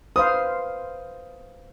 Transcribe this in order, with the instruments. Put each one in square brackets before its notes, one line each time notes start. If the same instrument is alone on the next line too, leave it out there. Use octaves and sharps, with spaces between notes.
[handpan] B4 C5 F5 [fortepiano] D#6